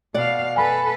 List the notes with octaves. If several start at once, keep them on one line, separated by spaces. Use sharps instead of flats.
B2 D5 F5 F#5
A4 B4 G#5 B5